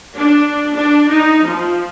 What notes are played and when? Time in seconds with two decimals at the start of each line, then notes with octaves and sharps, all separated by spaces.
0.16 D4
0.76 D4
1.09 D#4
1.44 F3